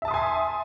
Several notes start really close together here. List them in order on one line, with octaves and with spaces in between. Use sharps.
E5 A5 D#6 C6 G#5